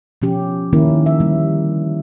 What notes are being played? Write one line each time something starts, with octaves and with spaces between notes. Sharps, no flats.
B2 F3 C#4 G4
D#3 A#3 C#4 E4 A#4
E5
D3 G3 A#3